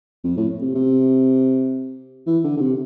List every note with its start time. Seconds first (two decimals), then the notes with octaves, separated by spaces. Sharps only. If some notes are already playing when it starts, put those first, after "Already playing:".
0.24 F2
0.37 A2
0.62 C3
0.75 C3
2.27 E3
2.44 D3
2.57 D3
2.60 C3